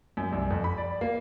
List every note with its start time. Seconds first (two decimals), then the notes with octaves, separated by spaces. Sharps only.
0.17 F#2
0.32 C2
0.50 F2
0.64 B5
0.78 D5
1.01 A#3